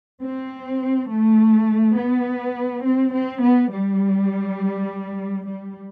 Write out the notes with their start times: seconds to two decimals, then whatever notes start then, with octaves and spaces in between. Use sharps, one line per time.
0.21 C4
1.08 A3
1.96 B3
2.83 C4
3.13 C4
3.42 B3
3.70 G3
5.46 G3